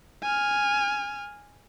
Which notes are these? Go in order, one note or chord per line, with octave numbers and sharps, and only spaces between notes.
G#5 F6